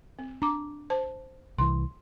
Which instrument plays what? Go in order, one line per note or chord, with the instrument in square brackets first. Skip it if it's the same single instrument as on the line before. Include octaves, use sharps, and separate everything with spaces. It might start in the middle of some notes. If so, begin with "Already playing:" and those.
[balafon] C4
[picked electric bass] D4 [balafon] A#5 D6
[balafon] C5 A5
[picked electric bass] C2 E3 [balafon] C6